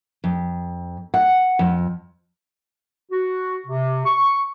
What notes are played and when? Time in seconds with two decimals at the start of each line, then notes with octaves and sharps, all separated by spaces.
0.24 F2
1.14 F#5
1.59 F2
3.10 F#4
3.67 C3
4.06 C#6